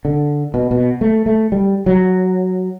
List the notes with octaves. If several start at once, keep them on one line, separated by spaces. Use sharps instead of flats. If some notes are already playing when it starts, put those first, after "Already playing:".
D3
B2
B2
A3
A3
G3
F#3